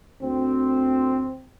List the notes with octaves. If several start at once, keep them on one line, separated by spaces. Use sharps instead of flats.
D2 C4